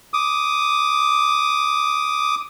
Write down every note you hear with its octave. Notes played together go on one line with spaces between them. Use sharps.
D6 D#6